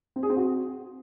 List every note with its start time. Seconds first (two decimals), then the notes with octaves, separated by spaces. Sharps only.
0.16 C4
0.23 G#4
0.30 C4
0.37 F#4